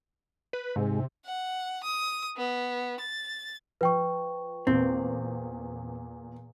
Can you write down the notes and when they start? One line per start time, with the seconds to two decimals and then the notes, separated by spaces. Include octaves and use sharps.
0.53 B4
0.76 G#2 C3 G#3
1.25 F#5
1.84 D#6
2.37 B3
3.00 A6
3.81 F3 B4 G5 C#6
4.67 E2 A#2 C4